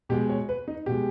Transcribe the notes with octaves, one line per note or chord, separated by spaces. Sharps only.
B2 G#3 G4
C#5
B4
D#4
B2 G#3 G4